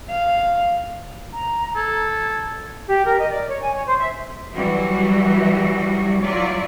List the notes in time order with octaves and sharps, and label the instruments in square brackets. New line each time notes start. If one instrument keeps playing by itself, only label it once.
[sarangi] F5
[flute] A#5
[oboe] A4 [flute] G#6
[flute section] G4
A#4
D#5
D5
C#5
G#5
C#5
C5
E5
[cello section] E3 F#3 G3 E4 F#4
F#3 E4 F4 D5